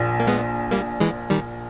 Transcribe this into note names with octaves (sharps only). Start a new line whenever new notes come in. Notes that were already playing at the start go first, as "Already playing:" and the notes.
Already playing: A#1 A#2
A#3
G#3 B3
G3 A#3
E3 G#3
D#3 G3